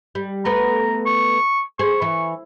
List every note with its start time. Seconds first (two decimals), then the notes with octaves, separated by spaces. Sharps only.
0.15 G3
0.45 A3 B3 B4 A#5
1.06 C#6
1.79 G#4 C5 C#6
2.02 E3